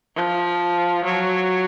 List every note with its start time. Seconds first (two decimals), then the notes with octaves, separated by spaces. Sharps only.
0.16 F3
1.05 F#3